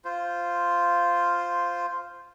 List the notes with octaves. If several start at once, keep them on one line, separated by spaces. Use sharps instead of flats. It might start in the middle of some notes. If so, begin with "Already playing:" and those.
F4 C5